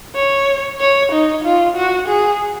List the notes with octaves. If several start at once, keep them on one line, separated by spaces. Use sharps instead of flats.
C#5
C#5
D#4
F4
F#4
G#4